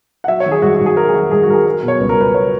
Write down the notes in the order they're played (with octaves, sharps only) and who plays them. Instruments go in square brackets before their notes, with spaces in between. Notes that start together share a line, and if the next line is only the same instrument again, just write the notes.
[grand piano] F#5
F#3 E5
C#5
D#3
G#4
G#2 F#4
F#4
G#2
G#4
F#3 A#4
G#4
D#3 F#4
G#2 G#4
F#4
G#2 A#4
G#4
F#3 A#4
B2
C#5
C#2 B4
A#4
C#2 B4
F#3 C#5